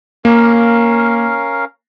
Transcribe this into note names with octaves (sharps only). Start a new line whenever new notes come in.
A#3 C#4 A#4 F5